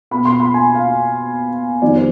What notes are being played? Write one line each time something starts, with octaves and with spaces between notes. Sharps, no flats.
B2 B3 B5
C6
B5
G#5
F5
F2 D#3 G3 B3 D5
C5